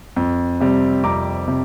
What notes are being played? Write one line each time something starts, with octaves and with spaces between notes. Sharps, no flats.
F2
C3 G3 C4
F2 A#5 D6
C3